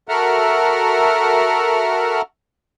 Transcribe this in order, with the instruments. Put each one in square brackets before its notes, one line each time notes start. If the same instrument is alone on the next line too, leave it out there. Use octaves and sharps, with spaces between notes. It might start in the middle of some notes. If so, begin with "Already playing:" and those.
[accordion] F#4 A4 A#4 E5 F#5 F6